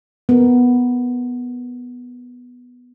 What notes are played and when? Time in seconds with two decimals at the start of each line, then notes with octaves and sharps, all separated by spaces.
0.29 B3 A#4